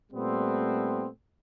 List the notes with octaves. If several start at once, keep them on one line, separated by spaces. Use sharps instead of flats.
A#2 G3 A3 B3 C4